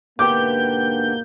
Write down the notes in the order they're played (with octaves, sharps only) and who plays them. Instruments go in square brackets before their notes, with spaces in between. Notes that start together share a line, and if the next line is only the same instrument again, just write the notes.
[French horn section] G#2 B2 A#3 [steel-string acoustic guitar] D3 B3 G4 [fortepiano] D6 [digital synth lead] G6